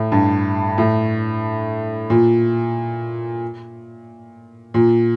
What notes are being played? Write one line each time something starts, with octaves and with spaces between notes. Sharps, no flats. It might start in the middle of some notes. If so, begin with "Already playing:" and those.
Already playing: A2
G2
A2
A#2
A#2